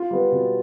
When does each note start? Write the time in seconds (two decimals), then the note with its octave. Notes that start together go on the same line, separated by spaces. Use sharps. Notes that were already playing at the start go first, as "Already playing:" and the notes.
Already playing: F4
0.11 G3 B3
0.32 B2